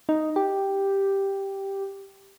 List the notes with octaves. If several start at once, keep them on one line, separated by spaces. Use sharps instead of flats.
D#4
G4